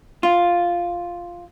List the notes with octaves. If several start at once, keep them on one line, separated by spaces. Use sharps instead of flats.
F4